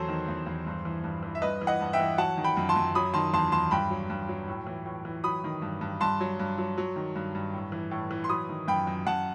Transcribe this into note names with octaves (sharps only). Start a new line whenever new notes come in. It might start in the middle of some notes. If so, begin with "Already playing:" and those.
Already playing: E2 F#3 A4 C5
D#3
E2
E2
G2
E3
G2
E3
E5
G2 B4 D#5
E3
D#5 F#5
G2
E5 G5
E3
F#3 F#5 A5
D#3
G5 B5
F#2
A5 C6
F#2
F#3 B5 D#6
D#3 A5 C6
E2 A5 C6
E2 A5 C6
G2 G5 B5
F#3
G2
F#3
A2
E3
A2
E3
F#3 B5 D#6
D#3
G2
G2
G2 A5 C6
F#3
G2
F#3
F#3
D#3
G2
G2
A2
E3
A2
E3
C6
F#3 B5 D#6
D#3
F#2 G5 B5
F#2
F#2 F#5 A5